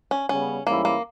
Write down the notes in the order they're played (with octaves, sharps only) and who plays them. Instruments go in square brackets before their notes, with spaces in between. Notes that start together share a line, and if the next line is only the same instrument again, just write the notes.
[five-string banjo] C#4
[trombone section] C#3 G3 B3 [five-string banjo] C#4
[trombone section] G#2 E3 G3 C#4 E4 [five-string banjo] A#3
[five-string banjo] A#3